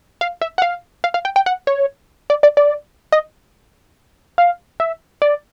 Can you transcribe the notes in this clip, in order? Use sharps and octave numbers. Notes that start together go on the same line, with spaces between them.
F5
E5
F#5
F5
F5
F5
G5
G5
F#5
C#5
D5
D5
D5
D#5
F5
E5
D5